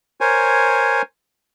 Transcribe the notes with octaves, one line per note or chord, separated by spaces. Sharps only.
A#4 C5 C#5 G#5